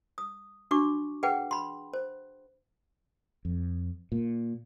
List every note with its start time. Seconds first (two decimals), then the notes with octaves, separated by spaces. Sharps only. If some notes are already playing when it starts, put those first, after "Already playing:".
0.18 D#6
0.71 D4 F#4 C#6 D6
1.23 G#4 B4 F#5 G5
1.51 B5 C6
1.93 C5
3.45 F2
4.12 A#2